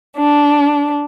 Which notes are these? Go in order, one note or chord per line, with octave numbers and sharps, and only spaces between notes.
D4